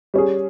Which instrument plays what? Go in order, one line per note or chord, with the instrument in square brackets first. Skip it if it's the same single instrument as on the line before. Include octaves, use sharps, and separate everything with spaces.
[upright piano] G3 C#4 G#4